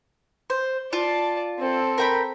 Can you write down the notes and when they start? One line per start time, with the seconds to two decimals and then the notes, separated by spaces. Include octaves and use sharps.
0.50 C5
0.93 F4 D5 A5
1.59 C4 A4
1.98 A#4 G5 B5